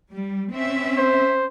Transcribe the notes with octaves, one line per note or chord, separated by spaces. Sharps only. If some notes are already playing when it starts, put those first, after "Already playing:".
G3
C4 C#4 E5
C5